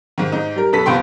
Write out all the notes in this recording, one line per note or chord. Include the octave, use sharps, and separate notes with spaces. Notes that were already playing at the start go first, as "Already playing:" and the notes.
G#2 D#3
G#2 D#4
G3 A#4
F#2 B2 A4 B4 B6
F#1 C#2 B3 G5 C6